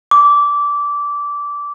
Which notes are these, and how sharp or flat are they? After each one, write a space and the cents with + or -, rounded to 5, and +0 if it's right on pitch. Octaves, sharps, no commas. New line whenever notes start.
D6 -15